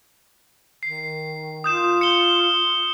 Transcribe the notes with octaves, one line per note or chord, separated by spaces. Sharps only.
D#3 C7
F4 D#6 G6 E7
C#7 G7